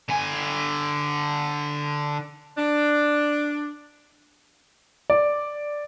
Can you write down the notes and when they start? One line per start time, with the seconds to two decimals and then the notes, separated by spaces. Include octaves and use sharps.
0.09 D3 G#5
2.58 D4
5.10 D5